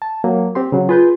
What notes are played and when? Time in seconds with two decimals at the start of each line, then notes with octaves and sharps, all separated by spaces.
0.02 A5
0.24 F#3 A#3
0.55 C4 G4 C6
0.72 C#3 F#3
0.89 F4 G#4 B4 G6